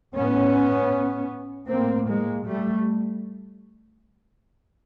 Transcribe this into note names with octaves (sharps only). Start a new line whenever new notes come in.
A2 B3 C#4
A2 A#3 C4
G#3 A#3
G3 A3